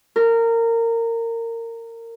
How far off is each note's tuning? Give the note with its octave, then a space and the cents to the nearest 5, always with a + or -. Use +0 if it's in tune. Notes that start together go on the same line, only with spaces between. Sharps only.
A#4 -20